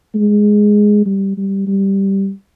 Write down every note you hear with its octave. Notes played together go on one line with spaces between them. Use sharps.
G#3
G3
G3
G3